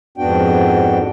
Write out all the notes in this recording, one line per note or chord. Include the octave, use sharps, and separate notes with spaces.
F2 G#2 B3 D4 F#4 G5